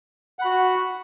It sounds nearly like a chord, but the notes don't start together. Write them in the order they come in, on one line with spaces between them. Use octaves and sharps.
F#5 B5 F#4